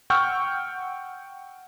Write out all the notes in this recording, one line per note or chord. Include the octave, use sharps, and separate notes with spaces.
F#5 G5 C#6 E6 F6 G6